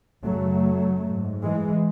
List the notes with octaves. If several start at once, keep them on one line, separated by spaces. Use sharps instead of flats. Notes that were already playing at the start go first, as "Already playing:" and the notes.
F#2 C#3 F#3 A3
G#2
E3 G#3